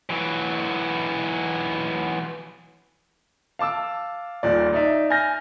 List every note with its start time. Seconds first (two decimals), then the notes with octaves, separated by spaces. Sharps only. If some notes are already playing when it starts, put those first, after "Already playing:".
0.10 E3 F#3
3.59 F5 A5 D6 E6
4.43 D#1 A#2 D5
4.73 D#4 D5 E5
5.10 G#5 F6 G6 A#6